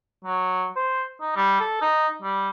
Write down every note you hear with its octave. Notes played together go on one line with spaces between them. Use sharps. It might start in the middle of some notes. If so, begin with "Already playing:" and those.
F#3
C5
D#4
G3
A4
D#4
G3